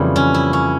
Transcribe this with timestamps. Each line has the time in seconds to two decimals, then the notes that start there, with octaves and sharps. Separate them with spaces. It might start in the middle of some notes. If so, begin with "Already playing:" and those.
Already playing: F2 C#3 E3 G3 A#3 E4
0.16 C#4
0.34 E4
0.53 C#4